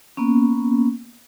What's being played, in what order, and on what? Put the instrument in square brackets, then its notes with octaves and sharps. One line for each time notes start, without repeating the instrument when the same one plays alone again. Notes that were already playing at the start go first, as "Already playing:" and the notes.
[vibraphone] A#3 B3 C#4